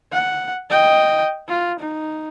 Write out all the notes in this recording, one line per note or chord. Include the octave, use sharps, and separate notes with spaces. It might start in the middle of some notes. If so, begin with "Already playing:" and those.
F#5
D#5 G5
F4
D#4